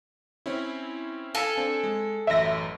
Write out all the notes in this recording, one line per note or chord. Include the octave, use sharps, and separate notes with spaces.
C4 C#4 E4
A4 F5 G#5 A5
C4 D4
G#3
A1 F#2 E5 A#6